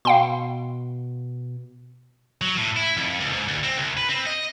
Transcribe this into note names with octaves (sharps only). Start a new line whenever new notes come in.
B2 F5 G5 C6
F#3
A2
E4
F2
C#2
G#2
D2
C4
C2
B4
C4
D#5